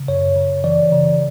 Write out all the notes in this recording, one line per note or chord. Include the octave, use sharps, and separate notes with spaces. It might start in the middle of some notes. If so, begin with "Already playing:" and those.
Already playing: C#3
F#2 C#5
C#3
E3 D5
C#3